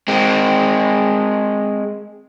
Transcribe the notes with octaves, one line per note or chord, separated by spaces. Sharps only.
G#3 C4